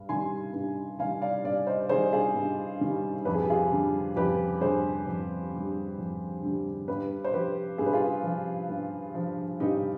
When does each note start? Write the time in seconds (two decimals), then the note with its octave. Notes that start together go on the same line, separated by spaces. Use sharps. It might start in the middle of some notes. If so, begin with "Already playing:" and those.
Already playing: G2
0.09 D#3 G3 G#5 C6
0.54 G2
0.99 D#3 G3 F5 G#5
1.21 D5 F5
1.44 G2 D5 F5
1.67 C5 D#5
1.89 D#3 G3 G#4 C5
2.13 F4 G#4
2.35 G2
2.81 D#3 G3
3.25 F2 B4
3.34 G#4
3.41 G4
3.50 F4 G#4
3.72 D3 G3
4.16 F2 G4 B4
4.61 D3 G3 G#4 C5
5.07 F2
5.52 D3 G3
5.98 F2
6.43 D3 G3
6.88 G2 G4 B4
7.24 C5
7.33 F3 G4 B4
7.78 G2 G#4
7.86 B4
7.93 F4 G#4
8.23 F3
8.69 G2
9.15 F3
9.60 G2 D#4 G4